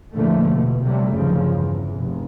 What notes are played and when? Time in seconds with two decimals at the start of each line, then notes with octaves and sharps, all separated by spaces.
0.14 E2 A2 D3 F3 A3 A#3
0.44 B2
0.84 C3 F#3 G3 A3
1.13 G1 D#2 C#3 F3
1.51 E2
1.95 F1